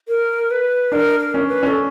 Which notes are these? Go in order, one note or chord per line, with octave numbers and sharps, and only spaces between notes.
A#4
B4
D4 A#4
A#4
C#4
B4
C#4 A4